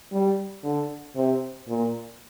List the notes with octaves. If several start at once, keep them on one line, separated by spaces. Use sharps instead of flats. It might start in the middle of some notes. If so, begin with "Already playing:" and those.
G3
D3
C3
A#2